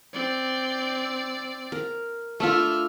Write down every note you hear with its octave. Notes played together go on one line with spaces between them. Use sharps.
C4 D5
A#4
A3 D4 F4 E5 F6